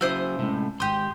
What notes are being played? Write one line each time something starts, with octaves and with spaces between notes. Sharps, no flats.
C#3 F#3 E4 C5 D#6
A2 C3 G#3 C#4
G#1 G#2 G4 C6 D#6